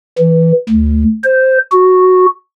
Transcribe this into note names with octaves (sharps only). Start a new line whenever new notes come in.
E3
D2
C5
F#4